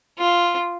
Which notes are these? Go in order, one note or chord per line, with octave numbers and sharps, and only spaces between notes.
F4